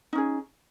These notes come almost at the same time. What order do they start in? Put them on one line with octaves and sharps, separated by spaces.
D#4 C#4 G#4